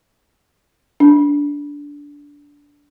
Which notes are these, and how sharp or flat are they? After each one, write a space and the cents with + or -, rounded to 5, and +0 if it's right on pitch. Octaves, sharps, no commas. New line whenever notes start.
D4 -20